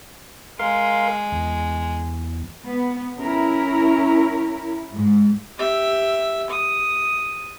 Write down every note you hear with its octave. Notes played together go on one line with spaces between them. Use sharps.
G#3 A#4 F5 C6
E2
B3
C#4 E4 A#4
G#2
G4 E5
D#6